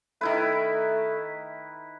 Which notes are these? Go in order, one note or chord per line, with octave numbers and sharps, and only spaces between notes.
D#3 A3 E4 B4